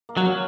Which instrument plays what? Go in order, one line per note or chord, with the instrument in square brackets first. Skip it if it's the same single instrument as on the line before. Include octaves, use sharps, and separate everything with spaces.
[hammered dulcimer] A#3
[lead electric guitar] F#3
[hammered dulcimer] C#4